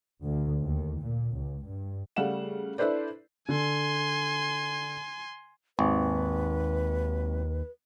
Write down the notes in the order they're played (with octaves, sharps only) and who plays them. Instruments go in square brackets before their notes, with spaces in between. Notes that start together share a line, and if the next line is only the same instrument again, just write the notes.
[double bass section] D2
D#2
A#2
C#2
G2
[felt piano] C#3 G3 A3 F5 F#5 E7
D4 E4 A4 B4 C5 D5
[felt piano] D3 [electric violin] G#5 C6
[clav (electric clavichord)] G#1 [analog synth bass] D#2 [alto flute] B4